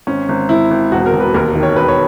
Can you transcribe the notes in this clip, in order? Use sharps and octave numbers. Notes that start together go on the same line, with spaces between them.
G#1 C#4
G#1
G#1 E4
G#1
E1 F#4
A#4
E1
B4
D#2 A#4
D#3
C#5
E1 B4
C#5